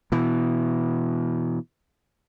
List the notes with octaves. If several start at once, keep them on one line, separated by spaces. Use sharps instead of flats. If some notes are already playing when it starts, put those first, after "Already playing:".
B2 E3